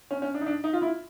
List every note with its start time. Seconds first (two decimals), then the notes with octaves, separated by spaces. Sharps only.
0.11 C#4
0.22 C#4
0.34 D4
0.41 D#4
0.46 D4
0.64 D#4
0.73 F4
0.82 E4